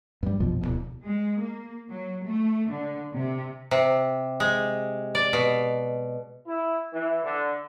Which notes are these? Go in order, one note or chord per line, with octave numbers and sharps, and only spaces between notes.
G2 G3
A#1 F2 B2 F3
D1 C2 B2
G#3
A#3
F#3
A3
D3
C3
C3
G#3
D5
B2
E4
E3
D3